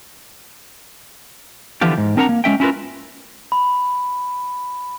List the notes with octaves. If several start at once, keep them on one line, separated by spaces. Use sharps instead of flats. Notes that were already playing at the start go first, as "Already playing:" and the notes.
D3 E3 F3 B3 F4 G4
G#2
C4 D4 A#4 F#5 A5 A#5
A#3
G#3 C#4 E5 G5
C#4 E4 F4 A#4 B4
B5